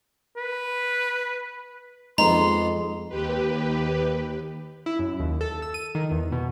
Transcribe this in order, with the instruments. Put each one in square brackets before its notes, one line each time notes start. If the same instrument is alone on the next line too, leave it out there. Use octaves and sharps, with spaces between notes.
[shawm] B4
[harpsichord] F2 B3 D#4 [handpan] G#3 [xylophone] A#5 [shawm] C6
[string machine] D#2 G4 B4
[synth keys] E4
F#2
D#2
A4
E6
D#7
D#3
E2
B2